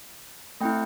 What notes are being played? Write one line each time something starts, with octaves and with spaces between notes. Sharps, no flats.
A3 C4 E4 G5